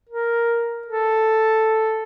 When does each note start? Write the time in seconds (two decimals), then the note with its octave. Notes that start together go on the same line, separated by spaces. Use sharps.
0.09 A#4
0.87 A4